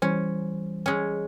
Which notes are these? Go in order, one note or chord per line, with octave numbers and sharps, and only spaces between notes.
E3 G3 C#4 C5
G#3 C#4